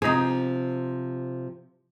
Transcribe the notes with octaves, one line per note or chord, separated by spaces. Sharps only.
C3 F3 D#4 G#4